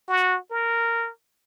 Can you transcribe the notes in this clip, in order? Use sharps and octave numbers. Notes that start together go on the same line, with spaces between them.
F#4
A#4